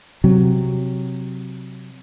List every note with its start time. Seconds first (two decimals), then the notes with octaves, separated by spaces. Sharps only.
0.24 C3 F#3